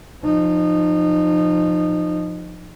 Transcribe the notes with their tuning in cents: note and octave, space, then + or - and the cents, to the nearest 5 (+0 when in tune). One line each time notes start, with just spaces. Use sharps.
F3 +0 D#4 -25